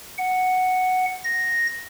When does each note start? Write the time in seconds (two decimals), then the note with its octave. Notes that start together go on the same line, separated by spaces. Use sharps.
0.18 F#5
1.24 A#6